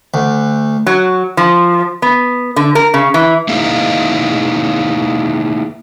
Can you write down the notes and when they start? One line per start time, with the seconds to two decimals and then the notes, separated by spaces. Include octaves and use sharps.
0.14 D2
0.86 F#3
1.37 F3
2.02 B3
2.56 D3
2.75 A#4
2.94 C#3
3.14 E3
3.49 A#3 D#4 E4 G#4 F5